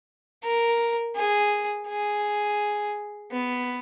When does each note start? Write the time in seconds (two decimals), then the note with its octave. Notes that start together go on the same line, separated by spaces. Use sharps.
0.43 A#4
1.16 G#4
1.88 G#4
3.32 B3